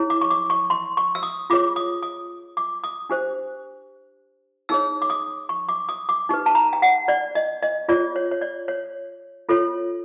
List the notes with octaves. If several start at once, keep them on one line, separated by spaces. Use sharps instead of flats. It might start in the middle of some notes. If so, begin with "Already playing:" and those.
Already playing: E4 G#4 C#5
D6
C#6
D6
C#6
C6
C#6
E6
D#6
F4 G#4 C#5 D6
D#6
D#6
D6
D#6
D4 G4 C5
D#4 G#4 C#5 E6
D6
D#6
C#6
D6
D#6
D6
D#4 G4 B4
A5
A#5
G5
F#5
D5
D#5
D#5
F4 G#4 C#5 D5
C#5
C#5
D5
C#5
F4 A4 C#5